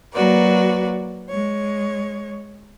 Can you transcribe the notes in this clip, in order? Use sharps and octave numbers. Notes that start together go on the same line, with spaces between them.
F#3 A#3 F#4 B4 D5
G#3 C#5